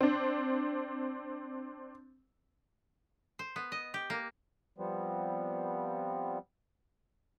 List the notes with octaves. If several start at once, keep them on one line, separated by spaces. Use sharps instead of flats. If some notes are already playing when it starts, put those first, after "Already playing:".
C4 D4
C5
B3
D#5
G4
A#3
F3 G3 B3 C4